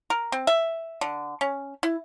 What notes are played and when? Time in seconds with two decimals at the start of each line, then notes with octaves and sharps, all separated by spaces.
0.10 A#4
0.32 C4
0.47 E5
1.01 D3
1.41 C#4
1.83 E4